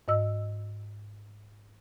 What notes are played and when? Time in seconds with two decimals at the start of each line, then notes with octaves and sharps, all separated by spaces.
0.08 G#2 D#5 E6